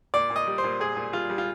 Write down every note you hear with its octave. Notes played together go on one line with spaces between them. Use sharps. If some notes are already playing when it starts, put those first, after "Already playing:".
A#2 D5
A#2
D#5
G3
C5
A#2
A#2 G#4
A#2
G3 F4
G3
F4